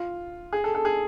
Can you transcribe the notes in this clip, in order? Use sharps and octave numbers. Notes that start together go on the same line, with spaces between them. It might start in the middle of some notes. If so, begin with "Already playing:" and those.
Already playing: F4
G#4
A4
A4
G#4